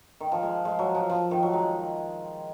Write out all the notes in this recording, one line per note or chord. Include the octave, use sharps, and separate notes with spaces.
D#3
F3
G#3
G#3
F#3
F3
F3
D#3
F#3
G#3